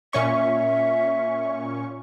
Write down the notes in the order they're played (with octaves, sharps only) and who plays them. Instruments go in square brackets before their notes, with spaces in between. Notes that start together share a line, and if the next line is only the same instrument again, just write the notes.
[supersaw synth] A#2 C#4 C#6 [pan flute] E5